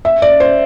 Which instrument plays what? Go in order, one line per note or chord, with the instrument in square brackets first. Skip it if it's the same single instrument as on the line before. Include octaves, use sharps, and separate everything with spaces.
[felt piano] E5
D5
C5